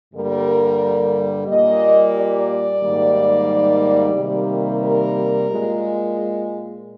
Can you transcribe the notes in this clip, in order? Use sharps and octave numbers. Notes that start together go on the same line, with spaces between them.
G2 D3 G3 A#3 A#4
A#2 G3 A#3 D#5
D5
G#2 D#3 G3 A#3
C3 D#3 G3 A#3
A#4
A#2 G#3